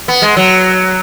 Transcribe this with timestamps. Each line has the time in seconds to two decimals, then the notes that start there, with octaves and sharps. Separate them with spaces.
0.08 B3
0.22 G#3
0.37 F#3